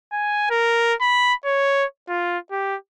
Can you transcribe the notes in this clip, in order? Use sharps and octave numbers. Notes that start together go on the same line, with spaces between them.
G#5
A#4
B5
C#5
F4
G4